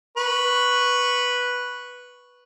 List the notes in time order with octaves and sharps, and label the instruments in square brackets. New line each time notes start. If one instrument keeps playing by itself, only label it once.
[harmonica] B4 C#6